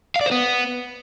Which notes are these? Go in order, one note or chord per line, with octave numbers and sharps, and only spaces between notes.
F5
D5
C5
B3